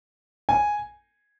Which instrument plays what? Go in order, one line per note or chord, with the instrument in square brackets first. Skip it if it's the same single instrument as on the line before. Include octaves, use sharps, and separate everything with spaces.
[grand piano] G#5